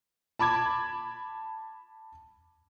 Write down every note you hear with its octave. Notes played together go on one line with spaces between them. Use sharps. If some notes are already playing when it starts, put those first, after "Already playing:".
A5 B5 D6 G#6